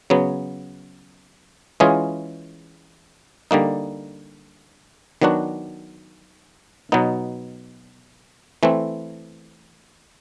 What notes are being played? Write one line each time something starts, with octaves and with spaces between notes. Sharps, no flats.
C#3 F#3 B3
E3 G#3 C#4 F4 G#4
D3 G3 A#3 D#4
D#3 F#3 B3 D4 F#4
B2 F#3 B3 D#4
E3 A3 C4